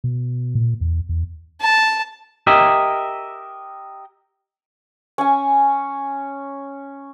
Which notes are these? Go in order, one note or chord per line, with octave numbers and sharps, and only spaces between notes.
B2
A#2
E2
E2
A5
G4 A#4 D#5 E5
C#4 G#5